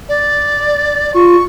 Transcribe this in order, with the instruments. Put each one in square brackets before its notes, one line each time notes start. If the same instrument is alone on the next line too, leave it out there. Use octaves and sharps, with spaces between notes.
[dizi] D5
[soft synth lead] F4 [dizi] C#6